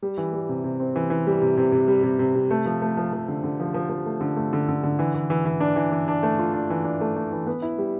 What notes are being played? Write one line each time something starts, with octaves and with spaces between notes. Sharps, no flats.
G3
E3
G3
C3
C3
C4
E3
E3
G3
C3
C3
C3
G3
C3
C3
C3
A3
F3
A3
F3
F3
D3
D3
F3
F3
F3
A3
D3
A3
D3
D3
D3
E3
E3
E3
E3
D4
E3
E3
D4
A3
F4
D4
E3
D4
A3
A3
E3
B3
E4
G3